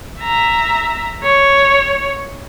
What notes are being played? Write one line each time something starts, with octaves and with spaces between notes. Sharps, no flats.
E5 A#5
C#5